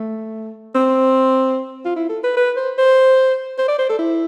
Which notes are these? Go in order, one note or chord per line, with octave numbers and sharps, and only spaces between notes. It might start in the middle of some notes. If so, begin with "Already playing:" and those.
Already playing: A3
C4
F4
E4
A4
B4
B4
C5
C5
C5
D5
C5
A4
E4